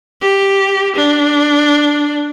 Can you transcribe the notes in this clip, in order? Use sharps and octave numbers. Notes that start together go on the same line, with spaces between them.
G4
D4